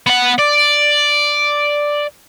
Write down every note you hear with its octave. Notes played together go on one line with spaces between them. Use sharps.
B3 F#5
D5